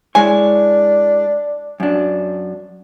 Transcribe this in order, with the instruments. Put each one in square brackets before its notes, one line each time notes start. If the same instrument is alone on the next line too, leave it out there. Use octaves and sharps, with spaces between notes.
[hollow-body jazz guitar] G#3 E4 C#5 [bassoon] D4 [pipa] G#5
[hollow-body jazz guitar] F#2 D4